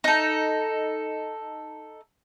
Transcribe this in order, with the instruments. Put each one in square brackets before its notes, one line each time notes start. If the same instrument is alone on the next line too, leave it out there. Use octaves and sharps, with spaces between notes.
[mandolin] D#4 A4